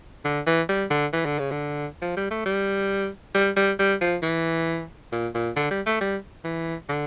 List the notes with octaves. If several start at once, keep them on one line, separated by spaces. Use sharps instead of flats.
D3
E3
G3
D3
E3
D3
C#3
D3
F3
G3
A3
G3
G3
G3
G3
F3
E3
A#2
A#2
D3
G3
A3
G3
E3
D3